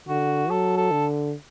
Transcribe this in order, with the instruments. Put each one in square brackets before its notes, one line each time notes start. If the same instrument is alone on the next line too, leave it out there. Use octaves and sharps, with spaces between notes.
[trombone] D3 [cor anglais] F#4
[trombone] F#3 [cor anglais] A4
[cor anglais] A4
[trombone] D3